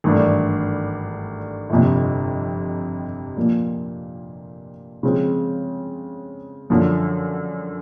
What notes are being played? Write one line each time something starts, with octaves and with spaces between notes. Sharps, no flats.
G#1 G2 E3 A3 D4
G1 F2 C3
A#2 F3 A#3
C#3 F3 G#3 C4
F#2 D3 F3